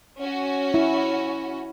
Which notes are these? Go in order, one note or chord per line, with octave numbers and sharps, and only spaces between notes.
C#4 F#4
E4